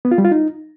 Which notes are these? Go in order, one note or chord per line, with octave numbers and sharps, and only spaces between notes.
B3
F4
G3
F4
D#4